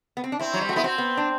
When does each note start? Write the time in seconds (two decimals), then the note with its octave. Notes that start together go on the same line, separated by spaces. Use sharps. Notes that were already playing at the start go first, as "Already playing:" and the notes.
0.17 B3
0.24 C4
0.32 D4
0.39 C4 E4
0.54 F#3
0.61 G3
0.69 A3 F#4
0.76 B3 E4
0.84 C4 F#4
0.98 B3
1.17 D4